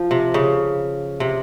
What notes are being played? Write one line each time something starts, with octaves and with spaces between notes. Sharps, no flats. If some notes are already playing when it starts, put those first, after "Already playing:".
Already playing: F3
C3
C#3
C3